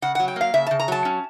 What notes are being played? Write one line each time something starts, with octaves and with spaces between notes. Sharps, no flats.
C#3 F#5
F#3 F#5
G5
A#3 F5
C#3 E5
C#3 A5
A#5
F#3 A5
C#4